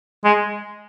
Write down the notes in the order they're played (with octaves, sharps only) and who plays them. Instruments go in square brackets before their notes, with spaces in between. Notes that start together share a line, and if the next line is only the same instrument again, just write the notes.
[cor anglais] G#3